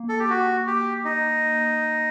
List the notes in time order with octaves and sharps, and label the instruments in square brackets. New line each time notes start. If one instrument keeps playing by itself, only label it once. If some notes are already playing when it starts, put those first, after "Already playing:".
Already playing: [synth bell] A#3
[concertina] A4
G4
F#4
G4
D#4